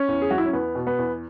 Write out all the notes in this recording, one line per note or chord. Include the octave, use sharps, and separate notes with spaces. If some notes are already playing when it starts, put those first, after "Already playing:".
Already playing: C#4
E2
G#4
F#3 F#4
E4
C#4
E2 B3
B2
B3
E2